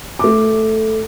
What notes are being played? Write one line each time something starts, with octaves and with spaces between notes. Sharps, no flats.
A3 D6